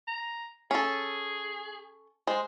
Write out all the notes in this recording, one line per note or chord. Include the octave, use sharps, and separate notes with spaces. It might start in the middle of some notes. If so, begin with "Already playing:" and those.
A#5
C#4 G#4 A4
G#3 C5